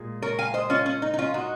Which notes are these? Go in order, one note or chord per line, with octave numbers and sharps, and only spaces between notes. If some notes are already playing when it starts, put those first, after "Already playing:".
Already playing: A#2 G#3
A#4 C#5
F5 G#5
C5 D#5
C#4 F4
C#4
D#4
D#4
C#4 F4
D#4 F#4